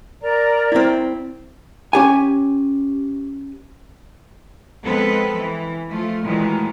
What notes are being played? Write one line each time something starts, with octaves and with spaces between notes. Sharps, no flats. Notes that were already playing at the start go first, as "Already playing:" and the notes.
A#4 D5 A#5
C4 E4
C#4 G4 G#5
F3 G#3 B3 C4 A4 B4
E3
F3 A3 F4
A#2 D#3 E3 F#3 G#3 A3